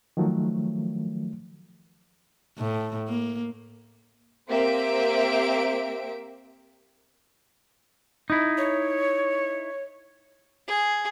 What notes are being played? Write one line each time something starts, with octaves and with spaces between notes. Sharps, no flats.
D#3 F3 F#3 A3
A2
A#3
A#3 C4 G4 C5 E5 D7
D#4 E4
C#5
G#4